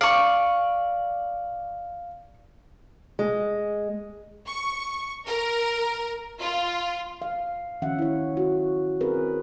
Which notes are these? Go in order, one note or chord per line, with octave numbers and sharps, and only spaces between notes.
D5 F5 C#6
G#3
C#6
A#4
F4
F5
D#3 F3 C#4 E5 F#5
E4 C#5
F#4
C4 G#4 A#4 B4